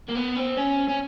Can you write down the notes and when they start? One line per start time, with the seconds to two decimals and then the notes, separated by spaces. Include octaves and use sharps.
0.09 A#3
0.16 B3
0.36 C4
0.57 C#4
0.88 C#4